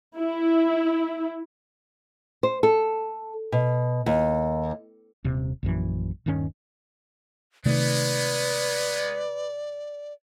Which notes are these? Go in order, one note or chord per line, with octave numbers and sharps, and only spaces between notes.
E4
C5
A4
B2
D#2
D#1 C3
A#1 F#2 E3
D#1 G2 D#3 C#4
C3 D#3 G#3 A3 B3 B4 D5